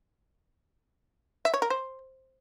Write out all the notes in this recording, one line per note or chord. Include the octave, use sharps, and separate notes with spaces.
E5
C#5
A#4
C5